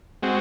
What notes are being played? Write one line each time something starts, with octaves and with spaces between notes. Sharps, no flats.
G#3 C4 F#4